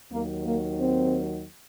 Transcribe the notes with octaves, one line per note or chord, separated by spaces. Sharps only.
D#2 D#3 F#3 A#3
A#3
C4